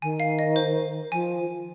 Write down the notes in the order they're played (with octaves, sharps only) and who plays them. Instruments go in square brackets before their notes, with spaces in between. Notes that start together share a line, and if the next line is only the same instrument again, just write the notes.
[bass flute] D#3 [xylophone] G#5
[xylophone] F5
D#5
C5
[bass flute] F3 [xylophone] G#5